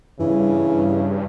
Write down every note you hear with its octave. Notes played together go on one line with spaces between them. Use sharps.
G2 C#3 E3